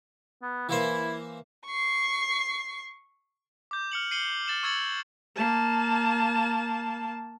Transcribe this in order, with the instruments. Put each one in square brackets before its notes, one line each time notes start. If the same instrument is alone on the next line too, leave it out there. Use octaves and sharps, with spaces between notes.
[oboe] B3
[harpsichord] E3 A#3 C5 [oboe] E4
[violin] C#6 C7
[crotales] D6 G6
F6 C#7 F#7
C7 C#7 D#7 F#7 G7
F6 A6 E7 F#7
C#6 E6 G#6 A6 C#7 F#7
[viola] A#3 A5